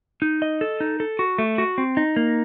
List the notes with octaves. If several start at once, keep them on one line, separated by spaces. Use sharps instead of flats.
D#4
D#5
A4
D#4
A4
F#4
A3
F#4
C4
D#4
A#3